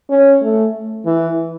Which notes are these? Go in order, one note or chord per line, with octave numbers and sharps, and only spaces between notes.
C#4
A3
E3